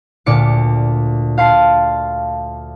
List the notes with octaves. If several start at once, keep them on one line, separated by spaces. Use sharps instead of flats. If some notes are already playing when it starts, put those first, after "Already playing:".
D2 A#2 D5 C#7
F5 A5 C6 C7